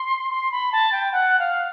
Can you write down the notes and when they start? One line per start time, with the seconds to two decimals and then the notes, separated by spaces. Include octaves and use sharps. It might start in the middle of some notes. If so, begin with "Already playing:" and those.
Already playing: C6
0.31 C6
0.52 B5
0.72 A5
0.92 G5
1.12 F#5
1.39 F5